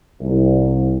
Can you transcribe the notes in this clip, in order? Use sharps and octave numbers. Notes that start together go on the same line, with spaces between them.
C2